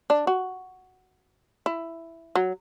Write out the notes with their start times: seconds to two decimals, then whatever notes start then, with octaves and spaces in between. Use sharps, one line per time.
0.10 D4
0.27 F#4
1.66 E4
2.35 F#3